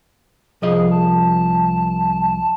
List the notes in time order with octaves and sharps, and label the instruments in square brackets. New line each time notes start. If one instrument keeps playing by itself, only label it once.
[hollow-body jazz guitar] C2 F3 D#5 [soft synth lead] G#4
[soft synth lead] A5